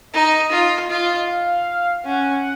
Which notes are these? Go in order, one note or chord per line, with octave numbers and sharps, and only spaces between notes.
D#4 D#5
F4
F4
F5
C#4 F#5